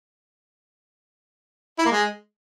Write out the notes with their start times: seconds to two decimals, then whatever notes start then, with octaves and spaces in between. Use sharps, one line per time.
1.79 E4
1.85 A#3
1.92 G#3